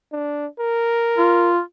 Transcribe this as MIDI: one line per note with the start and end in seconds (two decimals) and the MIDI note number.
0.12 0.47 62
0.59 1.51 70
1.18 1.61 65